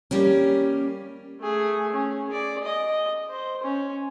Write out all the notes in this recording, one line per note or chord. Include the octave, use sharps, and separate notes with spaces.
G3 A#3 C#4
A3 G#4
C#4
G#4 D5
D#5
C5
C#4